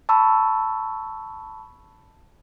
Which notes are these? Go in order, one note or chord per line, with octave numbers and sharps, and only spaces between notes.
A5 B5 C#6 E6